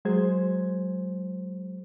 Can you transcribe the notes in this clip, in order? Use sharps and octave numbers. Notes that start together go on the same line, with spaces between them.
F#3 G#3 G#4 C5 G#6